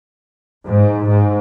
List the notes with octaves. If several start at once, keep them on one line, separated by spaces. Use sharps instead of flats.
G#2
G#2